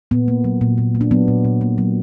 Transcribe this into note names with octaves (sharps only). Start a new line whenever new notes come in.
A#2 B3
A#3
F#3
A#2
A#2
A#3
D4
F#3 B3
A#2
A#2
A#3
F#3